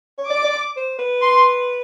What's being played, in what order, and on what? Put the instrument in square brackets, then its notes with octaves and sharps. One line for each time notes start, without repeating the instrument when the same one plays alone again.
[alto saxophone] C#5
[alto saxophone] D5 [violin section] D6
[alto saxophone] D5
C5
B4
[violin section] C6